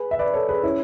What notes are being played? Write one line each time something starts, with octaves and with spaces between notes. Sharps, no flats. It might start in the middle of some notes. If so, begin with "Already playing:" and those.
Already playing: G#4 B4
E5
B4 D5
A4 C#5
G#4 B4
C#4 E4